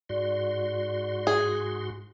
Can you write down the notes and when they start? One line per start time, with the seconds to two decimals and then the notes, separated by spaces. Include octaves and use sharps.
0.09 G#2 F#4 D5 C6
1.27 G#4